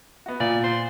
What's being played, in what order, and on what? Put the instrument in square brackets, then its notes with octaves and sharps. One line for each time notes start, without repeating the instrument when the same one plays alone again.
[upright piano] B3 F#4
[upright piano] A#2 [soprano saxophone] D5
[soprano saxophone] C5